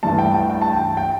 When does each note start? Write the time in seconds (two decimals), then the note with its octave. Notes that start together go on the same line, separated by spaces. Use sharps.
0.03 G2 E3 A3 A5
0.18 G5
0.34 G5
0.50 G5
0.62 A5
0.73 G5
0.97 G5